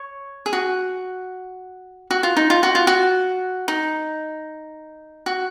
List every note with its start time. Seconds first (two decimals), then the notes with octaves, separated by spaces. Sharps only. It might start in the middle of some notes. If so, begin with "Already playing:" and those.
Already playing: C#5
0.46 G#4
0.53 F#4
2.11 F#4
2.23 F4
2.37 D#4
2.50 F4
2.63 F#4
2.75 F4
2.87 F#4
3.68 D#4
5.26 F#4